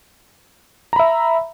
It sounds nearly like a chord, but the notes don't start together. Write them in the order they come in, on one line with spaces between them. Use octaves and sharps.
A#5 B5 E5